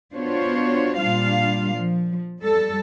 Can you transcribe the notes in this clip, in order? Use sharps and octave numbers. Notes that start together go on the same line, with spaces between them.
B3 D4 F4 F#4 C5 C#5
A#2 G3 D4 F4 F5
F3
G3 A4